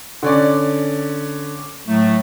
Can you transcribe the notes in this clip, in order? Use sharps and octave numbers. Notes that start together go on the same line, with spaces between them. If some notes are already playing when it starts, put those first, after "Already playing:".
D3 C#4 D5
A2 F#3 A3